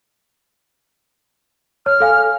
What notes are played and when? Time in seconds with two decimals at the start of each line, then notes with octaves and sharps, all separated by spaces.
1.86 C#5 F6
2.00 A4 F5 G#5